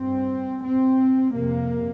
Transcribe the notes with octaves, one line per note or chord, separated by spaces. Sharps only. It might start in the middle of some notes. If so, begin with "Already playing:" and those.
Already playing: G2 C4
C4
F2 C3 A#3